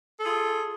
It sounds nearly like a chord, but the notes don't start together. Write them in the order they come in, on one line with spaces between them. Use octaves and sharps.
A4 G#4 F4